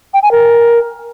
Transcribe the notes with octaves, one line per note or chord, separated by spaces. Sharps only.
G5
G#5
A#4